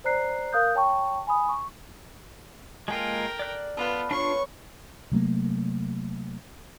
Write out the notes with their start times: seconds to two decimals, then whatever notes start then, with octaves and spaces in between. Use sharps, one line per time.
0.04 C5 D5 A#5 F#6 C7
0.53 A#4 F5 D#6 F#6 G6
0.75 C#5 G5 A5 C#6
1.27 G#5 B5 D#6
1.49 C#6
2.88 G#3 A#3 F4 A4 A#4 G5
3.39 D5 F#6
3.77 B3 F4 A4 B4 F#5
4.11 D4 F4 C#5 C#6
5.12 C3 F#3 A3 A#3